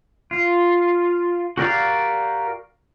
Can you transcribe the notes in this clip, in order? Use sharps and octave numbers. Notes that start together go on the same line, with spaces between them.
F4
F#4 G4 A#4 D5 F5